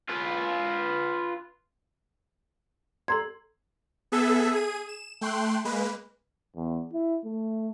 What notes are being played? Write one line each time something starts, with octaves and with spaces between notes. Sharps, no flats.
F4 B4
A4 A#5 C6 G#6
B3 G#4 A4 E5
G#4 D#7
E7
A3 G5 C6 F#6
G#3 A#3 B4
E2
E4
A3